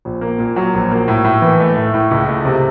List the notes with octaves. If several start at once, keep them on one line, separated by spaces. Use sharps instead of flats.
A#1
A#3
A#2
F#3
A#1
A#3
A2
A2
E3
A3
A2
A2
C#2
A3
C3